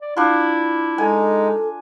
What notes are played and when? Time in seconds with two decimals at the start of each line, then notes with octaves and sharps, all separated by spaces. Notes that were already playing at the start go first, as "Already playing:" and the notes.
0.01 D5
0.17 D4 E4 F4
0.98 G#3 D#4 A4 G#5